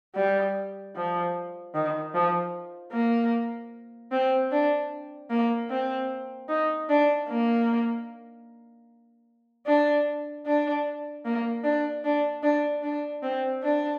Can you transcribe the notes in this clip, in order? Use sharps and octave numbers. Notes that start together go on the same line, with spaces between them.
G3
F3
D#3
F3
A#3
C4
D4
A#3
C4
D#4
D4
A#3
D4
D4
A#3
D4
D4
D4
D4
C4
D4